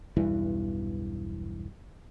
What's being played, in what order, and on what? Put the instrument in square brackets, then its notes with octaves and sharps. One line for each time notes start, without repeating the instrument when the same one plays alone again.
[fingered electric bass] B1 E2 G2 E3